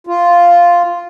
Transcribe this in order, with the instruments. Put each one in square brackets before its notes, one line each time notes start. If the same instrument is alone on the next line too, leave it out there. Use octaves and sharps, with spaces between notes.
[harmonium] F4